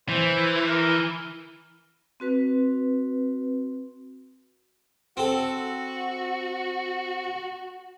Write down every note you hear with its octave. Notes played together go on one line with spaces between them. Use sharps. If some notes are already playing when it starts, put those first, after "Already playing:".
E3 C5
A#4
C4 F#4 B4
C4 F#4 A4